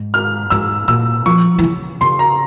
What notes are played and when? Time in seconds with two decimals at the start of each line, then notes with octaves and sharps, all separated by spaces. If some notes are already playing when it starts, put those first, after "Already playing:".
Already playing: G#2
0.14 F6
0.50 G#2 E6
0.88 A#2 E6
1.26 F3 C#6
1.58 E3
1.63 C#3
2.01 C#3 C6
2.19 A#5